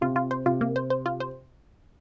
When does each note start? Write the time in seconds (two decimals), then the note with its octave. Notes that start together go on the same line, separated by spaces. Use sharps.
0.01 C3 F4
0.16 F4
0.31 C5
0.46 C3 F4
0.61 A#3
0.76 C5
0.90 C5
1.06 F4
1.20 C5